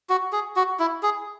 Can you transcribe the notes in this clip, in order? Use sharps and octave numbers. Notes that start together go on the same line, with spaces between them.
F#4
G#4
F#4
E4
G#4